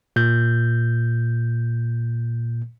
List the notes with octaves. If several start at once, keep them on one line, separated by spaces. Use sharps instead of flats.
A#2 G6